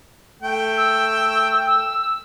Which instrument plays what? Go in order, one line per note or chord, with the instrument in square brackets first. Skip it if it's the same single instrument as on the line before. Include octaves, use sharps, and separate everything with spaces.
[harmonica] A3 G5
[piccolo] E6
E6